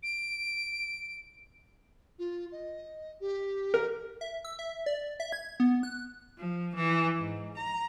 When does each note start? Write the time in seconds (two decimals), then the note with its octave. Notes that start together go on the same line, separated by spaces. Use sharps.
0.03 D7
2.18 F4
2.52 D#5
3.20 G4
3.74 A#4
4.21 E5
4.45 E6
4.59 E5
4.86 D5
5.20 E5
5.32 G#6
5.60 B3
5.83 F#6
6.37 F3
6.73 E3
7.18 G#2
7.55 A#5